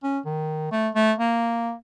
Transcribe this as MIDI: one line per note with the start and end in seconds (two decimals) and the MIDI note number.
0.03 0.19 61
0.25 0.68 51
0.72 0.89 57
0.95 1.13 57
1.19 1.73 58